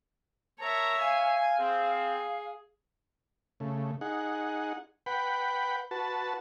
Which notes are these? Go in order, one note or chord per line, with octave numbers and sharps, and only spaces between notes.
A#4 C#5 E5 A5 A#5
F5 G#5
C4 G#4
C#3 A3
D#4 G#4 F#5
B4 F#5 G5 B5
F#4 B4 A5